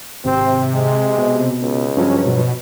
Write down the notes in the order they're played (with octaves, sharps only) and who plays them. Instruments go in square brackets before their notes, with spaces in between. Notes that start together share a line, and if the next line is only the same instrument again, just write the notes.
[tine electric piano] G#1 [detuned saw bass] C3 [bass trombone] C4
[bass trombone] G#3
[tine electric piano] B2
[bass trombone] C#2
[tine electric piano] G2 F3 F#3 [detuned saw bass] C#4
[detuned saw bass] B2